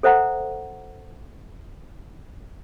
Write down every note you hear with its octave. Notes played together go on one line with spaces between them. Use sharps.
A4 C5 E5 F#5 A#5